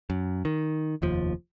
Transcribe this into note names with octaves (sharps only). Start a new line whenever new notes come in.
F#2
D#3
F1 D#2 F3